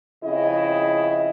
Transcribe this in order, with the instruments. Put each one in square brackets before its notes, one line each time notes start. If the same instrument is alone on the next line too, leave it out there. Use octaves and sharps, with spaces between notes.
[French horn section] F2 C#3 E4 D#5